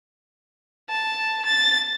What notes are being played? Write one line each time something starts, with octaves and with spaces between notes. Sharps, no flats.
A5
A6